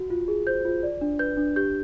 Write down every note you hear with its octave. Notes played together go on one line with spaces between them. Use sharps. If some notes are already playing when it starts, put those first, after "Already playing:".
Already playing: F#4
F4
G#4
C5 G6
F4
D5
D4
B4 G6
D4
G4 G6